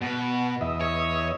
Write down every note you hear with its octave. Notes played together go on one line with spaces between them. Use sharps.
B2 B4
E2 D#5 E5
C#5